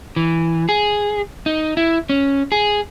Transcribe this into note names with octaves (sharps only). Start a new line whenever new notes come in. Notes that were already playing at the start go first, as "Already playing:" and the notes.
E3
G#4
D#4
E4
C#4
G#4